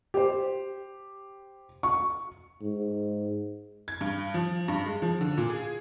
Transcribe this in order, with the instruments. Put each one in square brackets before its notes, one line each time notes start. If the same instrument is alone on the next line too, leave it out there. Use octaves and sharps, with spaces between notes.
[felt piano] G4 C5
C#6
[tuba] G#2
[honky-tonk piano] G#6
G2
F3
G2
G#3
F3
D3
A#2
G#4